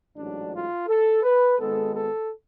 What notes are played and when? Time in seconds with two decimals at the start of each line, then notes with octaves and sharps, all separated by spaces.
0.17 A1 G#2 F#3 D4
0.53 F4
0.87 A4
1.23 B4
1.58 G#1 G#2 G#3 B3 A4
1.93 A4